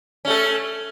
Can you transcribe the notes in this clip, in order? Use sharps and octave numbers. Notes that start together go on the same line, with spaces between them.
A3 C#4 A4